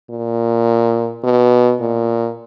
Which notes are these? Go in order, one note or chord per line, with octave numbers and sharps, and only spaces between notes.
A#2
B2
A#2